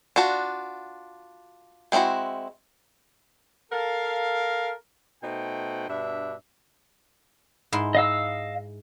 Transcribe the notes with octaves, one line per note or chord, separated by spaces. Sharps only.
D4 F4 F#4 A5
G#3 C4 C#4 E4 F#4
A4 A#4 F5
B2 A3 D#4 C5 F#5 G5
G2 B2 D4 E5
G#2 E4 C6
D#5 F5 E6